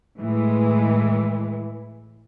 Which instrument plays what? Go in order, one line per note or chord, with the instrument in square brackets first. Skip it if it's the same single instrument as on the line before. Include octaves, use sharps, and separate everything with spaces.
[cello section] A2 E3 G#3